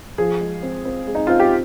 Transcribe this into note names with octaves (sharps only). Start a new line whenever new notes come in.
F3 G#4
G#3
C4
C4
G#3
D#4
C4 F4
G4